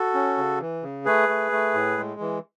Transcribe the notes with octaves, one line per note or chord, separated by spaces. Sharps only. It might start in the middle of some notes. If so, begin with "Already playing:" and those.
Already playing: F#4 A4
C#4
C#3
E3
C#3
A3 G#4 B4
A3
A3
A2
G#3
E3